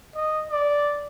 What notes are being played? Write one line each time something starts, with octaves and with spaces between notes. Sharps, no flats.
D#5
D5